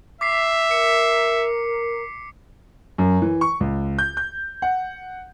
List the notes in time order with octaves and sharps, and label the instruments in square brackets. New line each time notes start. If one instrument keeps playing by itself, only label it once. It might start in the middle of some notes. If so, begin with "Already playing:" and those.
[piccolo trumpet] E5 [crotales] D6 B6 C7
[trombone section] A#4 [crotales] C#7
[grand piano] F#2
E3
C#6
C#2
G6
G6
F#5